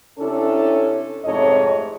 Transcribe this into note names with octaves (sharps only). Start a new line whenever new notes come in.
C3 C#4 D4 E4 A4
F2 G#2 C3 A3 C#5 D#5